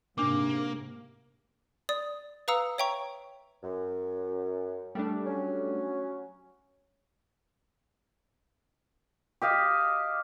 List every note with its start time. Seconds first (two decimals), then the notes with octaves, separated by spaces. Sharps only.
0.18 G#2 C3 A#3 D4 D6
1.89 D5 D#6
2.48 B4 F5 A#5 D#6 E6 C#7
2.78 C#5 E5 G5 A#5 C#6
3.63 F#2
4.95 G3 A3 D4
5.26 F#3 C#4
9.42 G4 D#5 F5